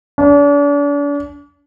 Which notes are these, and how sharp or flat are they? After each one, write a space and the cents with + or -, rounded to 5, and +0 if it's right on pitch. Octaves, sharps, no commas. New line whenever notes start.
D4 -40